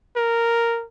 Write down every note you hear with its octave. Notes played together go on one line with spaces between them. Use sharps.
A#4